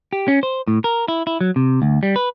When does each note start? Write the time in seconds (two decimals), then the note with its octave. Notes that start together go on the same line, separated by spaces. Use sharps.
0.13 G4
0.28 C#4
0.43 C5
0.68 A2
0.84 A#4
1.08 E4
1.27 E4
1.41 F#3
1.56 C3
1.82 D2
2.03 G3
2.16 B4